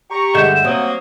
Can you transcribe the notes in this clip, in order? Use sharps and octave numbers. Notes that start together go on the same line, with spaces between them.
G4 A#5 C#6
G2 D3 G#3 E5 F#5 G6 E7
F#3 A#3 C4 D#6